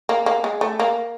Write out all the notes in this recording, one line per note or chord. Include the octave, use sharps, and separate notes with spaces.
A#3
A#3
G#3
A3
A#3